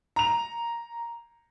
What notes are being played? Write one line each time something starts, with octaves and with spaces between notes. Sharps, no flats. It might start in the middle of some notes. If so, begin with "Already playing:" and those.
A#5 F7